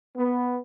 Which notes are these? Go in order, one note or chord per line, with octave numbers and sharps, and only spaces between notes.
B3